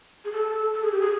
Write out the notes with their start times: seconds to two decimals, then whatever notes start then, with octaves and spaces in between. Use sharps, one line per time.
0.25 G#4
0.32 A4
0.74 A4
0.83 G#4
0.92 G4
1.01 G#4